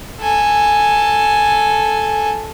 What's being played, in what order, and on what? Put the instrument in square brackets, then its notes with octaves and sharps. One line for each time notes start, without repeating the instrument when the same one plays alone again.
[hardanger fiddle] A4 G#5